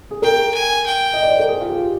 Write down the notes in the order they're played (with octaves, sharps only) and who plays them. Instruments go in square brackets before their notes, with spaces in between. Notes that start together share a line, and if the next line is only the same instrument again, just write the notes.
[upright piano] G#4
[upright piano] A#4 [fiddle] G5
[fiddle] G#5
G5
[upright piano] D#5
D5
C5
A#4
G#4
F4
G4